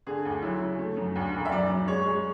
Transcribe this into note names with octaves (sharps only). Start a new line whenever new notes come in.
D3 G#4
D2
F#3 E4
C#3
A3
F#2
D2
E1
E5
F#2 D5
F#2
G#3 C#5
G#3